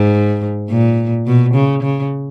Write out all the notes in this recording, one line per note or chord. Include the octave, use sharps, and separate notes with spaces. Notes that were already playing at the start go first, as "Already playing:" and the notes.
Already playing: G#2
A#2
B2
C#3
C#3